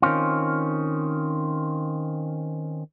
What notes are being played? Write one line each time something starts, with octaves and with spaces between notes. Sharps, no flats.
D#3 C4 C#4 F4